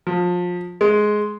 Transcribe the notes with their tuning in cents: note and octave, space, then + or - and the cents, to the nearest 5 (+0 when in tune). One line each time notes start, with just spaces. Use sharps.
F3 +25
G#3 +10